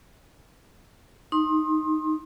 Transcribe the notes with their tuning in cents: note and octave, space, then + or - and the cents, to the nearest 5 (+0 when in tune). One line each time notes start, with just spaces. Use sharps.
D#4 +0 C6 +25